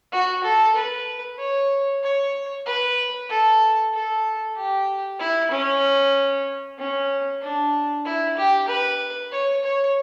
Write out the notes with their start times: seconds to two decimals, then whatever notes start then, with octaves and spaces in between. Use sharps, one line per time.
0.12 F#4
0.43 A4
0.75 B4
1.38 C#5
2.03 C#5
2.66 B4
3.29 A4
3.93 A4
4.56 G4
5.19 E4
5.51 C#4
6.78 C#4
7.41 D4
8.05 E4
8.37 G4
8.68 B4
9.32 C#5
9.64 C#5